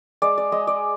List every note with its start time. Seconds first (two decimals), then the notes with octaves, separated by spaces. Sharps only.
0.22 G#3 D5
0.38 D5
0.52 G#3 D#5
0.67 D5